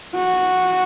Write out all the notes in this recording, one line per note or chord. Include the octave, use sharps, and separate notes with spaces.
F#4